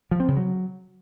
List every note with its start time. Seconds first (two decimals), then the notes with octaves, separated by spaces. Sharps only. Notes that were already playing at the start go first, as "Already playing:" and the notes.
0.11 F3
0.20 C4
0.28 C#3
0.37 F#3